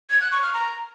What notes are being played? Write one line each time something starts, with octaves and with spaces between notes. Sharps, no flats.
G#6
F#6
C#6
F6
A#5